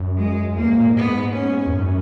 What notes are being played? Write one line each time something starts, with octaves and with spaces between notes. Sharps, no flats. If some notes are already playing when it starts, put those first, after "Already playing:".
Already playing: F#2
G#3
F#2
E2 A#3
G#2
A#2
G#2
B3
C#4
E2
F#2